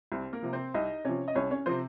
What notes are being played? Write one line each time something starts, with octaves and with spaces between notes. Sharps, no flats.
C2 C4
A#3 A#4
C3 F3
C4 C5
C2 D#4 D#5
C3 F3 C#4 C#5
D#5
C2 C#4 C#5
C#4 C#5
C3 F3 C4 C5